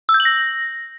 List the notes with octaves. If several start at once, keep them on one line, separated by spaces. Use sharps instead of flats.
E6
G6
F#7
A#6